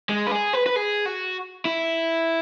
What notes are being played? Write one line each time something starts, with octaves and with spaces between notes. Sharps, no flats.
G#3
B4
G#4
B4
B4
G#4
F#4
E4